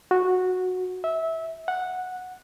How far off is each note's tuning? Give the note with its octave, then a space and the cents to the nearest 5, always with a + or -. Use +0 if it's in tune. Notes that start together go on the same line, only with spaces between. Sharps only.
F#4 -10
E5 -20
F#5 -10